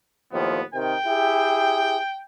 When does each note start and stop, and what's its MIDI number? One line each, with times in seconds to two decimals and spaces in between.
0.32 0.61 39
0.32 0.61 45
0.32 0.61 53
0.32 0.63 59
0.74 0.94 48
0.74 0.94 51
0.74 2.23 79
1.06 1.98 64
1.06 1.98 67
1.06 1.98 68